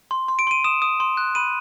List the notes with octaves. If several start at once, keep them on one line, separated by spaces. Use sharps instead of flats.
C6
C6
D7
C6 D#7
D#6 E7
D#6
C6
F#6
B5 D#7